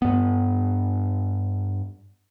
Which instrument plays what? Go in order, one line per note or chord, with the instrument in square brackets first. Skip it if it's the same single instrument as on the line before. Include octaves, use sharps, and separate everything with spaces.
[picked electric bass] G2 B3